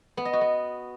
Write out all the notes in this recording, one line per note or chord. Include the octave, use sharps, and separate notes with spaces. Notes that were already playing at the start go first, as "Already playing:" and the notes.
B3
D#5
F#4
B3